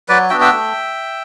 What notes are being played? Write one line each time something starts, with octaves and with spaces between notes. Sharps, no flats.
F#3 B4 D5
B3 D4 F#4 E5 G5
E5 G5
A3